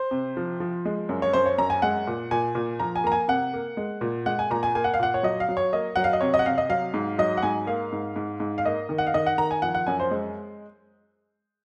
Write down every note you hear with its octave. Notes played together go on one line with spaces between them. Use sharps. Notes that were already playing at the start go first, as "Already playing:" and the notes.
Already playing: C5
C3
F3
F3
G#3
F#2
C#5
F#2 C5
C#5
F#2 A#5
G#5
G#3 F#5
A#2
A#2 G#5
A#2
F3 A#5
G#5
A#3 A#5
G#5
C3 F#5
A#3
G#3
A#2
G#3 F#5
G#5
A#2 A#5
G#5
A#3 G#5
F#5
F5
A#2 F#5
C#5
F#3 D#5
F5
F#3
C#5
A#3 D#5
F#3 F#5
F5
D#5
C3 C#5
D#5
F#5
C3 F5
D#5
F#3 F5
G#2
F#3 D#5
F#5
G#2 G#5
A#3 F5
G#2
G#2
G#2
F5
A#3 D#5
D#3
F#5
F5
D#3 D#5
F#5
D#3 A#5
G#5
F3 F#5
F#5
F#2 G#5
C5
G#3